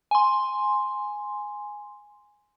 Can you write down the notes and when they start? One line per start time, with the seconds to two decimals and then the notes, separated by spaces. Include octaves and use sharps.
0.11 G#5 C6